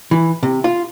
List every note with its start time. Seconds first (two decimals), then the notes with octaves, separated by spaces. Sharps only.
0.11 E3
0.43 C3
0.64 F4